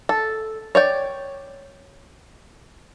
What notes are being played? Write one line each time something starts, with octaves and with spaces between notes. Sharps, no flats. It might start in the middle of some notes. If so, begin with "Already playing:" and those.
A4
C#5 D5 G5